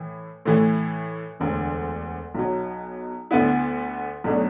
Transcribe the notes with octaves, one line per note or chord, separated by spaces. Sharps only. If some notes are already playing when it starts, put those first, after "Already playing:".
Already playing: A2 E3
A2 E3 A3
E1 D2 D3
B1 B2 F#3
D2 D3 B3 E4
B1 B2 F#3 A3 D4